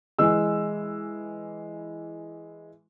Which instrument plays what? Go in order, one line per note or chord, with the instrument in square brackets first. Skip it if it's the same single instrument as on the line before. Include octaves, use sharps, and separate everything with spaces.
[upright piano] E3 G#3 E6